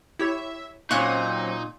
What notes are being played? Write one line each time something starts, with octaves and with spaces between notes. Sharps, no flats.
E4 G4 C#5 E5
A#2 F#3 C4 C#4 D#4 C#6 F#6 G#6